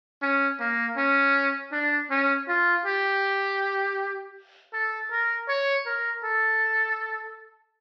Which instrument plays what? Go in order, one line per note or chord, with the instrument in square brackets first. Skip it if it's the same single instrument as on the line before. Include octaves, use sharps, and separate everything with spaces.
[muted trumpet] C#4
A#3
C#4
D4
C#4
F4
G4
A4
A#4
C#5
A#4
A4